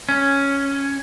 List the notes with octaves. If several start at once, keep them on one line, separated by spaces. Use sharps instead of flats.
C#4